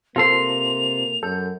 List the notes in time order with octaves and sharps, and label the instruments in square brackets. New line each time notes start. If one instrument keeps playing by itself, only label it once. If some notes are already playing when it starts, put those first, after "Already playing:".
[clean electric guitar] C3 C6 [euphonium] A#3 [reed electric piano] F4 A4 C5 [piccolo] F7
[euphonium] F#2 [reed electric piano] A4 [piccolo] G6